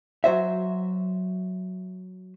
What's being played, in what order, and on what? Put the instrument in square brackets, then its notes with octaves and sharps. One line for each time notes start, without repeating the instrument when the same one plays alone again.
[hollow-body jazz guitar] F#3 F#4 C5 E5